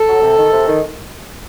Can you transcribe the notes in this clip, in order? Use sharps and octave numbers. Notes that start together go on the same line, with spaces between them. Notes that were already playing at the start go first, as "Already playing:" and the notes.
Already playing: A4
F#3
C3
D#3
C3
D#3